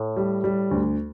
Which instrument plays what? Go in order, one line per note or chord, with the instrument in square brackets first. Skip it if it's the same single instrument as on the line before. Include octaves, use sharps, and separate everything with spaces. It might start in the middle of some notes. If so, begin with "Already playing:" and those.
Already playing: [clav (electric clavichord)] A2
[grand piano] G3
G3
D2